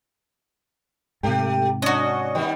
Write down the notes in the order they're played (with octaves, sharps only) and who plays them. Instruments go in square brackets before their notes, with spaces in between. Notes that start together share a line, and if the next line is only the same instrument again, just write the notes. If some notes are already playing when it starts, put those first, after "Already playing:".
[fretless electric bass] G#2 C3 [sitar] A3 G4
[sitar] C#4 D4 [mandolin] F#4 D#5
[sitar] D#3 G3 B3